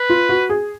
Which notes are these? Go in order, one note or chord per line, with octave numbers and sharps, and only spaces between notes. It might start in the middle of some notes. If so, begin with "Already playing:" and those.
Already playing: B4
F4
F#4
G#4